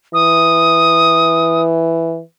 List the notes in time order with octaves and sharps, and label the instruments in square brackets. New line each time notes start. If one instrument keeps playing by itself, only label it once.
[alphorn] E3 [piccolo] D#6